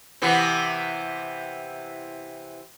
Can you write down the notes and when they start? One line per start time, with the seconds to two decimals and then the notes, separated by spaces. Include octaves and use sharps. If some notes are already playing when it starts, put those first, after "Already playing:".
0.22 C3 E3 B3